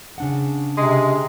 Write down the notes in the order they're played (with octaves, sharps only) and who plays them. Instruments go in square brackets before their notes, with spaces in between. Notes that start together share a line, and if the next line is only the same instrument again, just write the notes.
[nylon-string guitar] C#3 D4 F#5
[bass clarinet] C3 [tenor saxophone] G#3